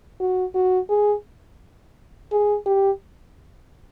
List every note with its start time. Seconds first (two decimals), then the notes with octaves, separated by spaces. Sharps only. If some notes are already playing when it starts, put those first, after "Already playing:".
0.20 F#4
0.55 F#4
0.90 G#4
2.32 G#4
2.66 G4